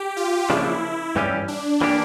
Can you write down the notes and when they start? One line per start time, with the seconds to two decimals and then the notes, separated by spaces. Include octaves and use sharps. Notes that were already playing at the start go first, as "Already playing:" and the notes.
Already playing: G4
0.17 F4
0.50 C#3 F3 A#3 D4 E4
1.16 G2 E3 G3 C#4 G4
1.48 D4
1.81 E3 A#3 D4 G4